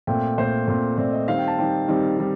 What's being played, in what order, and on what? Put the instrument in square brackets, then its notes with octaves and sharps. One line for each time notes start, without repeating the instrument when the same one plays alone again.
[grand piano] A#2 A3 C4 G5
A#2 A3 C4 C5
A#2 A3 C4
A#2 A3 C4 D5
D#5
D#3 G3 C4 F5
G5
A5
D#3 G3 C4 G5
D#3 G3 C4
D#3 G3